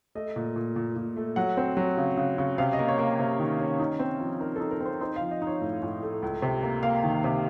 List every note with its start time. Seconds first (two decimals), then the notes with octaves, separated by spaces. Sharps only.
0.15 A3 D#5
0.36 A#2
0.56 A#2
0.76 A#2
0.96 A#2
1.16 A3
1.36 F#3 F#5
1.57 C4
1.77 F#3
1.97 C#3
2.17 C#3
2.38 C#3
2.58 C3 F5
2.73 D#5
2.79 A#3
2.88 C#5
2.98 A#3
3.19 C3
3.39 D#3
3.59 C#4
3.80 D#4
3.99 C4
4.20 F3
4.40 D#4 A#4
4.56 D#4 A4
4.71 A#4
4.81 C4 C5
5.01 D#4 C5
5.16 F3 F5
5.31 D#5
5.42 D#4
5.47 C#5
5.61 A2
5.82 A2
6.03 A3
6.22 C#2
6.42 C3
6.62 A#3
6.83 A#3 F5
7.04 D#3
7.24 C3